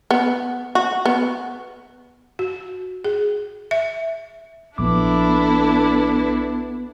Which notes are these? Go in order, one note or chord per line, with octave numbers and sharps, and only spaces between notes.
B3
F#4
B3
F#4
G#4
E5
A#1 B3 D4 E4 A4 D6